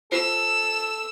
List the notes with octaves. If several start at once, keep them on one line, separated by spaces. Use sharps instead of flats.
F4 A4 C5 E6